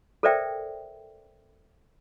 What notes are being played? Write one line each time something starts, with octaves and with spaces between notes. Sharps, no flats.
A4 A#4 C5 D5 E5 G5